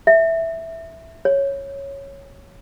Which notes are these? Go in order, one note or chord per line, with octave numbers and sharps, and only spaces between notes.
E5
C#5